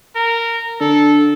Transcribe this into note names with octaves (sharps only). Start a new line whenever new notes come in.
A#4
D3 A4